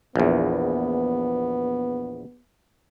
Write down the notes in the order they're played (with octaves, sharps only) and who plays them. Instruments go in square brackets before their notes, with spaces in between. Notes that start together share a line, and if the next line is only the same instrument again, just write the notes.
[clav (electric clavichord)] A#1 E2 [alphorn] B3